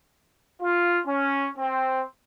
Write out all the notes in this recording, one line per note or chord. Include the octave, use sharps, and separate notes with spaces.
F4
C#4
C4